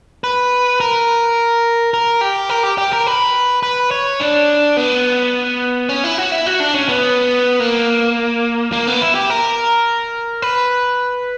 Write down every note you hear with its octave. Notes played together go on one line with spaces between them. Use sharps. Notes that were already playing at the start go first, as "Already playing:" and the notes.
B4
A#4
A#4
G4
A#4
G4
G4
A#4
B4
B4
C#5
D4
B3
C#4
E4
F#4
E4
F#4
D4
C#4
B3
A#3
A#3
B3
E4
G4
A#4
B4